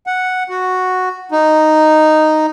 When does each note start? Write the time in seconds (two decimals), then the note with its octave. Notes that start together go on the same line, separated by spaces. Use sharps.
0.07 F#5
0.49 F#4
1.32 D#4